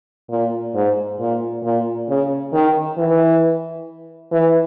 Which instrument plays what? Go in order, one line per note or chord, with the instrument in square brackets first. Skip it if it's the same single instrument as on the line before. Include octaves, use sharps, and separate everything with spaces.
[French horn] A#2
G#2
A#2
A#2
C#3
D#3
E3
E3